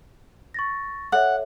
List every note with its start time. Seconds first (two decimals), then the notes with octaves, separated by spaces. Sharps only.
0.54 C#6 A6 A#6
1.12 A4 C#5 E5 F#5